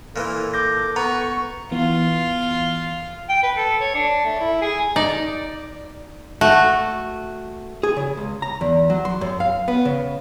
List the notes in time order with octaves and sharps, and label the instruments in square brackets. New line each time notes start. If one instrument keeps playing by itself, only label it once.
[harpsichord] A#2 E3 [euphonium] A4
[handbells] D6 G6 A#6
[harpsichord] B3 [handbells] A#5 [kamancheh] C#6
[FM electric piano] E3 B3 [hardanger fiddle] F4
[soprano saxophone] G5
B4
A4
C#5
D4
A3
E4
G#4
[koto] D#4 D5
A3 F#4
[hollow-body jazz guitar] G#4
C#3
C#2
A#5
E2
F#3
C6
F#2
F5
B3
C#3